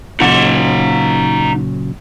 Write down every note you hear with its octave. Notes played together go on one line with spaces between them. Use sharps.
A#2 C#3 F#3 D#4 F#5